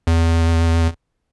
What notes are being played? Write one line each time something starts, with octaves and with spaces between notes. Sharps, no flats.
E2